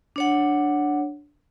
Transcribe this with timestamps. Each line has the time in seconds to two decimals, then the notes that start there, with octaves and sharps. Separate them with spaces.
0.16 D4 C#5 F#5